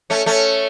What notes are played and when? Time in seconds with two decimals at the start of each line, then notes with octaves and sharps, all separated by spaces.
0.10 A3 C#4
0.26 A3 C#4